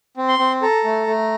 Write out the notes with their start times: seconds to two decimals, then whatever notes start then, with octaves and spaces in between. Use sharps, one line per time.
0.17 C4
0.29 C6
0.39 C4
0.62 A4 A#5
0.84 A3
1.07 A3